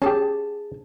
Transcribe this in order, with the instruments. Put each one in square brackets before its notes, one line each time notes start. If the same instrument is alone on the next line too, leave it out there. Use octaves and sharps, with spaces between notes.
[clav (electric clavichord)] C#4 G4 [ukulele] G#4 A5